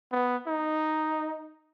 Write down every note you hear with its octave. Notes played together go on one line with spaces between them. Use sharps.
B3
D#4